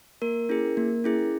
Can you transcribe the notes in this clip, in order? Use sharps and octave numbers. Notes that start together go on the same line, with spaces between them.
A#3 A#4
C#4 E4 G#4
A#3
C#4 E4 G#4